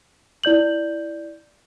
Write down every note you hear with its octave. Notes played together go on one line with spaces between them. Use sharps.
E4 D5 G6 F#7